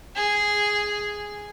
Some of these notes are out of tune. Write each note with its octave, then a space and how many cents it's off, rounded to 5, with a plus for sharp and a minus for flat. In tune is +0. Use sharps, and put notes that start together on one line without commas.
G#4 +0